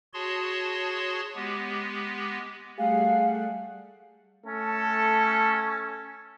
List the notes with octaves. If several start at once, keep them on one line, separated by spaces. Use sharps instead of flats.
F#4 G#4 C#5 A5 C6
G#3 B3 G4
G3 A3 G#4 F5 F#5
A3 C#4 A4